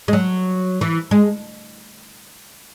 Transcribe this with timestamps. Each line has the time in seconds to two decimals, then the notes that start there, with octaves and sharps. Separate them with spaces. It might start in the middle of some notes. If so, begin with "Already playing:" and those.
0.08 G#3
0.13 F#3
0.81 E3
1.11 G#3